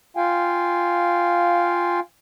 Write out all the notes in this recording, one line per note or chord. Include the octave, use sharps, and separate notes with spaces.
F4 F5 G5 G#5